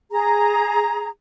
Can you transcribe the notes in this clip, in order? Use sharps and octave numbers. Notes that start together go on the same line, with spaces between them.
G#4 A#5